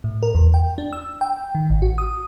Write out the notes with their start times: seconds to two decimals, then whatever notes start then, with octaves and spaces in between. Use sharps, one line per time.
0.04 A2
0.23 A#4
0.35 E2
0.54 G5
0.78 D4
0.93 E6
1.21 G5
1.55 D#3
1.70 A1
1.82 F#4
1.98 D#6